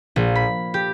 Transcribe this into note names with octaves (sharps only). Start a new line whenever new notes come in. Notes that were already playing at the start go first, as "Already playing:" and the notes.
A#1
B5
G4